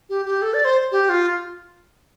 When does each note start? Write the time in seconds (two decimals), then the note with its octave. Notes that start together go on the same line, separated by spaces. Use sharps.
0.10 G4
0.26 G4
0.42 A4
0.54 D5
0.65 C5
0.92 G4
1.09 F4